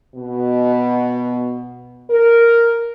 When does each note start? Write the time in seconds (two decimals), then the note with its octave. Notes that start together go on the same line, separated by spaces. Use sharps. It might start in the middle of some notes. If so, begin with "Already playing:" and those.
0.15 B2
2.11 A#4